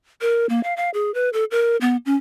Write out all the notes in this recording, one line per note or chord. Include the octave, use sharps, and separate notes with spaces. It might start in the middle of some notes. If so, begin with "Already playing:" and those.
A#4
A#3
F5
F5
G#4
B4
A4
A#4
B3
C#4